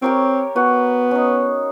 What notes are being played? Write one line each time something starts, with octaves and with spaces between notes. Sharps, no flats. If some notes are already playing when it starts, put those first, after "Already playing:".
C4 G4 A#4 C#5
B3 F#4
C#4 D#4